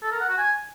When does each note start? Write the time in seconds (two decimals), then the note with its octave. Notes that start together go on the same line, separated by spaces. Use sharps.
0.03 A4
0.12 A#4
0.20 F#5
0.29 F#4
0.38 G#5